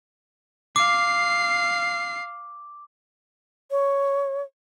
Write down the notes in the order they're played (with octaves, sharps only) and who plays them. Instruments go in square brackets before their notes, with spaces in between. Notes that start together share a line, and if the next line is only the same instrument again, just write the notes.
[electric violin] F5 C7 [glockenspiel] D6
[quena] C#5